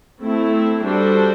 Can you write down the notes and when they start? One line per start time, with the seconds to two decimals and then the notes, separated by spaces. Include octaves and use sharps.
0.23 A3 C4 E4
0.83 G3 D4 F#4 A4 C5